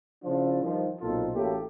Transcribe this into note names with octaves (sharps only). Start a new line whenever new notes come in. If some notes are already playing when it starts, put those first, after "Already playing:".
C#3 F3 D4 E4 F4
G2 D#3 F3
B1 A#2 C4 D#4 F4 A4
A1 A2 A#3 F#4 G4 A4